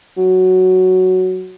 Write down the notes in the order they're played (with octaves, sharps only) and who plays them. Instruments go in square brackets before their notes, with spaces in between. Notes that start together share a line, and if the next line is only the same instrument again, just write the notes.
[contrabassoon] F#3